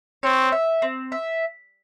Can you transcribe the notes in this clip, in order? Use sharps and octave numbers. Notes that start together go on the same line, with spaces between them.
C4 C#5
E5
C4
E5